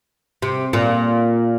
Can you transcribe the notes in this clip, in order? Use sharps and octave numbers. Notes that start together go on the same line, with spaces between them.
C3
A#2